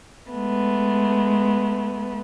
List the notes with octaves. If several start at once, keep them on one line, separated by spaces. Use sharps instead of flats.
G#3 A3 B3